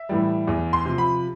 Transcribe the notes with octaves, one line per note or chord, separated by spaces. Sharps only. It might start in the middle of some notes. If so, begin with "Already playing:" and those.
Already playing: E5
A2 E3 G3
E2
C6
C3 F3
B5